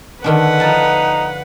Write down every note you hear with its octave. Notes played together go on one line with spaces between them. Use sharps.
D3 D#3 D4 B4 F#5
F3 D#4 A5